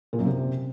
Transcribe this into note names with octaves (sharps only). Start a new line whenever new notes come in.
A#2
F#2
C3